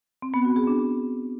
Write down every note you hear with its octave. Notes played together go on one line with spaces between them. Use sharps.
C4
B3
F#4
G#4
D4